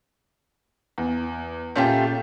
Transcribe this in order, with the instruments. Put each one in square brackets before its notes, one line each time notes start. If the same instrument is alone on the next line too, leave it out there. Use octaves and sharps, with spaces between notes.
[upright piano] E2
[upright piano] A#2 C#4 G6 [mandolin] A3 F4 G4